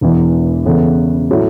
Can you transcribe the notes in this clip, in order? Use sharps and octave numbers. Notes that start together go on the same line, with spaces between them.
E1 E2 E3 B3 E4
E2 C#3 E3 B3 A4
A2 F#3 A3 E4